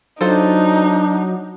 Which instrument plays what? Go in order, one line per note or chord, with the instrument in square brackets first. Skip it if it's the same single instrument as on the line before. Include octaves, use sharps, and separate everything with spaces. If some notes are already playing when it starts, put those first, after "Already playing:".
[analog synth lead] F#3 [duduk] D4 [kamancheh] D#4 [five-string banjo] F4 A4 C5